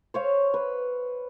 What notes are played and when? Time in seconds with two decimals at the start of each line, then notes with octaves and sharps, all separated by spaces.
0.14 C5 C#5 F5
0.54 B4